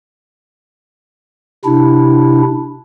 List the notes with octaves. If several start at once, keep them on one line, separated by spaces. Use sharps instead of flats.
C3 D4 E4